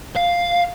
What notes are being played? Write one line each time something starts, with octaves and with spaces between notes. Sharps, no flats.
F5